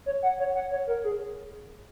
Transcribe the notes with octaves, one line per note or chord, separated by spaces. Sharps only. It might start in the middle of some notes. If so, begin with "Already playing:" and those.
C#5
F#5
C#5
F#5
C#5
A#4
G#4